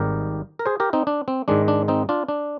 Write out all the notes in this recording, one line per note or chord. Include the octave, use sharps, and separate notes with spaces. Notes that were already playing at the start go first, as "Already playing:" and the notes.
Already playing: G#1 G#2 G3 G4 A#4
A#4
G#4 C5
G4 A#4
C4 D#4
D4
C4
G#2 D#3 G#3 D4
D4
C4 D#4
D4 F4
D4